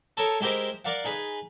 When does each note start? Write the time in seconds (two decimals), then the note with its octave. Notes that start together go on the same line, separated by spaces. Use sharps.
0.17 A4 A#4 C#5 D#6
0.40 G#3 E4 G4 A#4 C5 D#5
0.85 A#4 D5 F5 F#5
1.05 D#4 G#4 B4